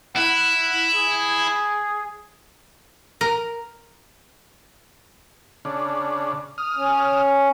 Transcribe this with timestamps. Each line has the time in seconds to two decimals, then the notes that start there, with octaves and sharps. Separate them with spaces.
0.16 E4 F#5
0.95 G#4
3.21 A#4
5.65 C#3 D4
6.58 D#6 F6
6.77 C#4